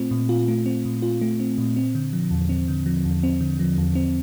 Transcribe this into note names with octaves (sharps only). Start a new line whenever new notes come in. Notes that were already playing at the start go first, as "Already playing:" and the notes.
Already playing: A#2 A3 C4 F4
A#2
F4
A3
C4
A#2
F4
A3
C4
A#2
C4
D3
F3
E2
C4
D3
F3
E2
C4
D3
F3
E2
C4